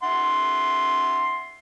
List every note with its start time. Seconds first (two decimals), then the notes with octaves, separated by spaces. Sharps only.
0.03 E5 F#5 C6